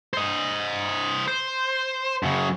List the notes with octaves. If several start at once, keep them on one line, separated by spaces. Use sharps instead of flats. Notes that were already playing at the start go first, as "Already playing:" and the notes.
C5 D#5
C5
F#2 C#3